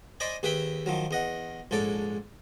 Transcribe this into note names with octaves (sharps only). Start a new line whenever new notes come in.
C5 D5 D#5 G#5 B5
D#2 G#4 B4 E5 G5 B5
D#3 F3 F#3
E2 D#5 F#5
A#1 G#2 A4 C#5 D5